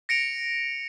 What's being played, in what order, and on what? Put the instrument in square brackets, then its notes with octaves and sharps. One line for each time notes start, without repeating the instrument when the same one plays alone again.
[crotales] A#6 C#7 D7 F7